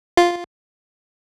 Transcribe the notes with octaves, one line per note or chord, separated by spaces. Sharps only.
F4